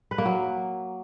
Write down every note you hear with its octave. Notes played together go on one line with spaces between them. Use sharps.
B4
A#3
F#3